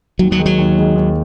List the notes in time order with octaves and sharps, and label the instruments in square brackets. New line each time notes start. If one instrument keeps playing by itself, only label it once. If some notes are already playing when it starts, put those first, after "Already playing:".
[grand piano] D#2 [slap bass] F#3
[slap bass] F#3
[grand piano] D#3 G#3 D#4
[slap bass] F#3
[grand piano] D#2
D#3 G#3 D#4
D#2